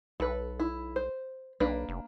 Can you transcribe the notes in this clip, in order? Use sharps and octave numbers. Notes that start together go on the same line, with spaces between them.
B1 A4 B4
E4
C5
B1 A#3 D4 B4
F1